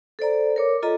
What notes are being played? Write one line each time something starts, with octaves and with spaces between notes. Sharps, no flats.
A4 C5 D5 A#5
A#4 C#5 D6
F4 A4 D#5 A#5